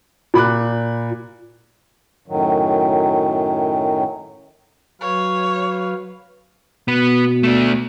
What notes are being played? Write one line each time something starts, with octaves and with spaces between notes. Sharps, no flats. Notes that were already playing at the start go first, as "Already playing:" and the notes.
A#2 B5 D6 F#6
F#2 A2 D#3 F#3
F#3 B4 C#5 F5
B2 B3
A3 D4